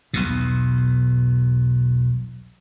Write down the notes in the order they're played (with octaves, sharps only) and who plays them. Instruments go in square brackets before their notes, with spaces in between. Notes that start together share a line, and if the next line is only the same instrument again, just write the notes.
[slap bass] B1 E2 B2